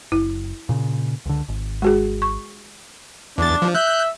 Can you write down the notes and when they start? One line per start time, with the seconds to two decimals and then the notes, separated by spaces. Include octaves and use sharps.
0.12 F#1 E4
0.69 A#2 C#3
1.25 C#2 D3
1.48 G#1
1.82 G#3 F#4 G#4
2.22 C#6
3.38 E2 D4 A6
3.62 F3
3.75 E5 F#6 G6